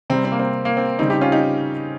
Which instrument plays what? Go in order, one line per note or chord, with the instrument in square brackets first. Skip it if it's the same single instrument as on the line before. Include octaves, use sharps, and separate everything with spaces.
[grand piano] C3 G3 C4
C4
A#3
C4
A#3
C4
C#3 G3 C4 D#4
D#4 G4
C#4 F4
D#4 G4